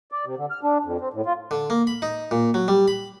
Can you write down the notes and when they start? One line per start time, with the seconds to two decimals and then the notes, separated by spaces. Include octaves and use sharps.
0.12 D5
0.25 C3
0.37 D3
0.51 F6
0.63 D4
0.84 F2
1.01 C4
1.13 A2
1.26 F4
1.51 D3
1.70 A#3
1.87 B5
2.02 D#4
2.31 A#2
2.54 F#3
2.68 G3
2.88 B5